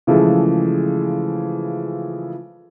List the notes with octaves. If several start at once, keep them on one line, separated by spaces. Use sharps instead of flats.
C#3 E3 F3 G#3 A3